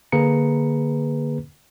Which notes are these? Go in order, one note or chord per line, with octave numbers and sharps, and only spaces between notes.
D3 A#3 G#4 B4 A#5 C#7